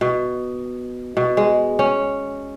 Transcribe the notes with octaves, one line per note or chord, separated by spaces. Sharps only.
B2
B2
G#3
C#4